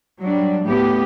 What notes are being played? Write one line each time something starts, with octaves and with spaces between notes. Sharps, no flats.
F#3 G3 D4
A2 B3 G4